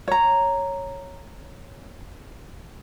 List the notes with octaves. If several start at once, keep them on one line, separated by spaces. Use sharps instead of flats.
C#5 A#5